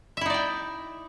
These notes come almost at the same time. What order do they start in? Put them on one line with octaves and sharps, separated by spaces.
E5 E4 D#4 D5 G5